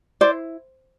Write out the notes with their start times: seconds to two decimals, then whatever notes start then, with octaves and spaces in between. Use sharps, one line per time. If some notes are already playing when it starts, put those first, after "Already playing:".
0.21 E4 C5 D5